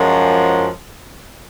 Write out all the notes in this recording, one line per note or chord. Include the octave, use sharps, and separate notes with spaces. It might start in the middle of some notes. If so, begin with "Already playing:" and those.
Already playing: F#2 F3 G#3